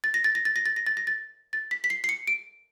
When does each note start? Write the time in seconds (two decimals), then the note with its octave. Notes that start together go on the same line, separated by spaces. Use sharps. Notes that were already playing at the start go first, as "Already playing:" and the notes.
0.04 A6
0.14 A#6
0.24 A6
0.35 A#6
0.45 A6
0.56 A#6
0.66 A6
0.76 A#6
0.86 A6
0.97 A#6
1.07 A6
1.53 A6
1.71 B6
1.84 B6
1.90 C7
2.04 C7
2.09 C#7
2.27 D7